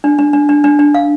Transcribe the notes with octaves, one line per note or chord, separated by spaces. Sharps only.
D4
D4
D4
D4
D4
D4
F5